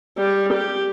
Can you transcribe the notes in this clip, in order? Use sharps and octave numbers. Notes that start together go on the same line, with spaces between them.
G3
G4